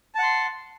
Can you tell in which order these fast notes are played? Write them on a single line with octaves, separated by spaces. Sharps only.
A5 F#5 C6